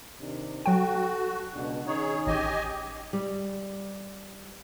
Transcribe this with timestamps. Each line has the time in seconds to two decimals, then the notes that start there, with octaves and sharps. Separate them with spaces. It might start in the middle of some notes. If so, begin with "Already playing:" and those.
0.20 C3 D#3 D4
0.66 F#3 F#4 A4 G5
1.54 C#2 B2 D4
1.87 D#3 C#4 D#4 G#4 C#5
2.27 A1 G4 D#5 G#5
3.13 G3